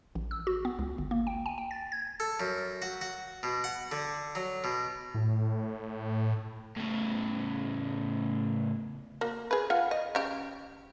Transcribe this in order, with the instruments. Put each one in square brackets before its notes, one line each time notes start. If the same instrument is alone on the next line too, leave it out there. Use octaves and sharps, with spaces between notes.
[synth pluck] A1
E6
F#4
B3
C#2
G1
A#3
G5
G#5
G5
A6
G#6
[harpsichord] A4
F#2
F#4
F#4
B2
F#5
D3
F#3
B2
[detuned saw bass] A2
[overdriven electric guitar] A2 C#3
[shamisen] A#3 F#4
G#4 B4
F4 F#5
D#5
C#3 G4 G5